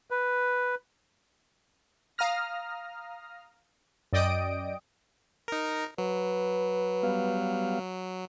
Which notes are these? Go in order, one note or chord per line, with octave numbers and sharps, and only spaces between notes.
B4
F5 A#5 D#6 F6 A#6
F#2 D5 D#5 G5 D#6 D7
D#4 A#4
F#3 B4
G3 B3 F5